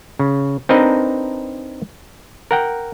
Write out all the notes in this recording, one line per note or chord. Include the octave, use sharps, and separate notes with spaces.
C#3
C4 D4 D#4 A#4 B4 D#5
A#4 F#5 G5